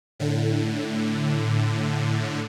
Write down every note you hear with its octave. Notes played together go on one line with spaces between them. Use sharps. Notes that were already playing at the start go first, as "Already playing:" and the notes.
A2 D3